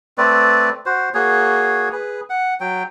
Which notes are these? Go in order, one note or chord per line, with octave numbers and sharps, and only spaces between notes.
A3 C4 B4 D5
F#4 C5
A#3 F#4 G#4 C#5
G#4 B4
F#5
F#3 G5